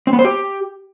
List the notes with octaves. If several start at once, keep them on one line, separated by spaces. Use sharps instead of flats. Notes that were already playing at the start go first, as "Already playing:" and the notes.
C4
B3
C5
G4